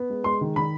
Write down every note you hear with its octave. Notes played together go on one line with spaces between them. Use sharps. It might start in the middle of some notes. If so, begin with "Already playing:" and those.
Already playing: B3
G#3
G#3 C6
D#3
D#3 B5